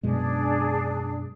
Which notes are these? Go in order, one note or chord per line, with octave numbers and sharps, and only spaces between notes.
F#2 B2 G#3 D4 G#4